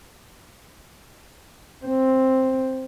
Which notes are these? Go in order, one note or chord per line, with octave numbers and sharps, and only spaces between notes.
C4